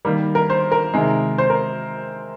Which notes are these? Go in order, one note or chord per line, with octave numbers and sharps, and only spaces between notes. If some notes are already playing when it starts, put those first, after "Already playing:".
D#3 G3 A#3
A#4
C5
A#4
C3 D#3 G#3
C5
A#4